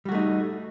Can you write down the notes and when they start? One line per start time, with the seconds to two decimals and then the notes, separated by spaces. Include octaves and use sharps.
0.05 G3
0.09 F#4
0.12 A3
0.15 D#4